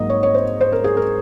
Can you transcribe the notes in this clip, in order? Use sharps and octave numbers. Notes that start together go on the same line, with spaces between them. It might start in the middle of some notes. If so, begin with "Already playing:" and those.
Already playing: G#2 F#3 A#3 D#5
C#5
C#5
C5
C5
A#4
G#4
A#4